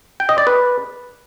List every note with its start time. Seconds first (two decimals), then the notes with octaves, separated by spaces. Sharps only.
0.20 G5
0.29 D#5
0.38 D5
0.47 B4